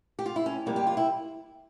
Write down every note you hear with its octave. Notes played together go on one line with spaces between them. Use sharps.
G4
F4
E4
C#4
F2 C3 G3 A#3 E4
G4
F4
E4